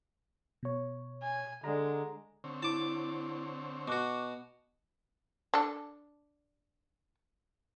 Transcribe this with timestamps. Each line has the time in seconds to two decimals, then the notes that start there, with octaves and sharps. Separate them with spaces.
0.63 B2 C#5
1.23 G#5
1.64 D3 G#3 A#5
2.44 D3 C4 C#5
2.63 E4 A5 D6
3.88 B2 F#4 C#6 D6 F#6
5.54 D4 A4